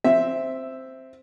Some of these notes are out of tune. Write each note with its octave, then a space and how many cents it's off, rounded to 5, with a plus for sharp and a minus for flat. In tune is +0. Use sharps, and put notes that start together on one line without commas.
C4 +0 E5 +0